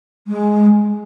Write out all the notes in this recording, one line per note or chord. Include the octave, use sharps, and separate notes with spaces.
G#3